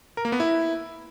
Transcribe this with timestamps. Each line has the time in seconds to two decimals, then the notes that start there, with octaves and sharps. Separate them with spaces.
0.17 A#4
0.25 A#3
0.32 B3
0.40 E4